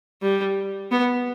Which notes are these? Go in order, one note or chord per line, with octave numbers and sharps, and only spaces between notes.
G3
B3